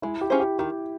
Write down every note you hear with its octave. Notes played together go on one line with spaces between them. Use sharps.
G#3 E4
G4
C#4 F4 G#4 C5
G4
D#3 G4